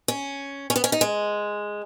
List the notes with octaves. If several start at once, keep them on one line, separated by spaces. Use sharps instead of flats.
C#4
C#4
B3
C#4
D#4
G#3